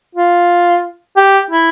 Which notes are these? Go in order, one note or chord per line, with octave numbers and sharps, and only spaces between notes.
F4
G4
E4